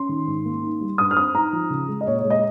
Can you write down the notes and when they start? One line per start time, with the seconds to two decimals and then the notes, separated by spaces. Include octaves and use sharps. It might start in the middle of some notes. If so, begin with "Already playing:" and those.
Already playing: C#4 C6
0.09 D#3
0.27 G#2
0.45 A#3
0.63 D#4
0.80 G3
0.98 G2 D#6
1.11 F6
1.17 C4 D#6
1.35 D#4 A#5
1.53 F3
1.70 C#3
1.88 G#3
2.01 D#5
2.07 A#2 C#5
2.19 C#5
2.24 G#3
2.30 D#5